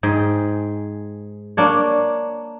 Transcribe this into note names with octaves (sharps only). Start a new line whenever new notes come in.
G#2 G#4 G5
A#3 D4 C#5